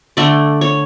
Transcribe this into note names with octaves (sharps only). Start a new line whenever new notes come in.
D3 A3 D5
C#5